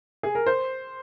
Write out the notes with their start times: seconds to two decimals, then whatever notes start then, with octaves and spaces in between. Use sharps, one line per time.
0.23 G#4
0.35 A#4
0.46 C5